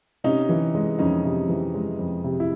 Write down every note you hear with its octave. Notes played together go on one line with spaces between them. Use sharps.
C3 C#4 D#4
E3
G#3
F2 C#4 D#4
C3
E3
G#3
F2
C3
E4